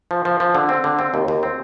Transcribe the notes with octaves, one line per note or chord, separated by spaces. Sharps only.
F3
F3
F3
D3
C4
D3
C4
D#2
D#2
C4